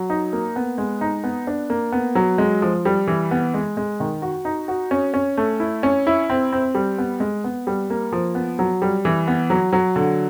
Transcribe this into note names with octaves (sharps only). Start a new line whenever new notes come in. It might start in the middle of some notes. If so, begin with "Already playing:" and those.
Already playing: F#3
D#4
A#3
B3
G#3
D#4
B3
D4
A#3
B3
F#3
G#3
F3
G3
E3
B3
G#3
G#3
D#3
F#4
D#4
F#4
C#4
C#4
A3
E4
C#4
E4
C4
C4
G3
B3
G#3
B3
G3
A#3
F3
B3
F#3
G3
E3
B3
F#3
F#3
D3